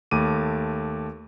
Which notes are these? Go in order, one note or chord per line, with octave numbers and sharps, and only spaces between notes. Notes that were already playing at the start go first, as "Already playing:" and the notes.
D#2 A3 D6 D#7